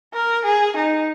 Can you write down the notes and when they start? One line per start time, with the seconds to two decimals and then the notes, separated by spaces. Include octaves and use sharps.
0.14 A#4
0.45 G#4
0.76 D#4